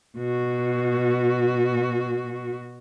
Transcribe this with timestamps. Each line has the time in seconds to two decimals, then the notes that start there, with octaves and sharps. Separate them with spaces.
0.17 B2 F#4